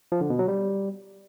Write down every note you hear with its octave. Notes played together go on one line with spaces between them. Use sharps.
F3
D3
B2
F#3
G3